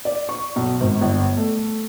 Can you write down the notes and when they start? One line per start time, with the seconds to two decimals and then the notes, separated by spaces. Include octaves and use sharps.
0.05 D5
0.29 C#6
0.56 B1
0.80 G#1
1.01 G1
1.37 A3